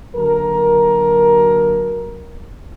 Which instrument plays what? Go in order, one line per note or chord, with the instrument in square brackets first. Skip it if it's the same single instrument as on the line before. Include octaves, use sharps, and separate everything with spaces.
[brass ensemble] D3 F#3 A#3 A4 A#4